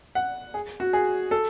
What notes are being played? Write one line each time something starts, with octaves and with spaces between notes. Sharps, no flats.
F#5
G#4
F#4
G#4
A4